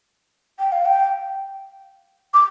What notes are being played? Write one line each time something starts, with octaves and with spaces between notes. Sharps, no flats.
G5
F5
G5
D6